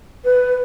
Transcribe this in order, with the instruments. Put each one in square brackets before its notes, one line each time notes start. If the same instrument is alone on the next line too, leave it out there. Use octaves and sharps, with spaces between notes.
[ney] B4